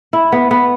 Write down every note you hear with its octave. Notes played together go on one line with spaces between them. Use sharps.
E4
B3
B3